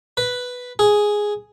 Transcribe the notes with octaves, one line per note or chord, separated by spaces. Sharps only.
B4
G#4